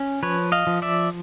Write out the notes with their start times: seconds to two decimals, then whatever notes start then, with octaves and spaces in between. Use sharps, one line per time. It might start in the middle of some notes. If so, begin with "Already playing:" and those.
Already playing: C#4
0.23 F3 B4 C#5
0.52 D#5 F5
0.67 F3
0.82 D5 E5